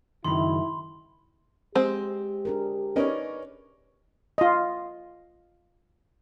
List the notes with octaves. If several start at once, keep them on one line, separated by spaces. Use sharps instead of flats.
C#2 F#2 D#3 E4 B5 C6
G#3 C4 G4 C5
D4 G#4 A#4
C#4 D#4 A#4 B4 C#5 D5
F4 D#5